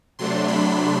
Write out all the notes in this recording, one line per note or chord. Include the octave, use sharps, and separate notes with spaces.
C3 F#3 A3 D4 C6
B5